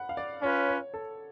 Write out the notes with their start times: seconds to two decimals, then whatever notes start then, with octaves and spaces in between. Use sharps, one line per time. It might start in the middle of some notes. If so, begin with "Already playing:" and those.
Already playing: F#5 B5
0.09 F5
0.17 D5
0.42 C#4 F4 B4 C#5
0.68 C#5
0.94 A4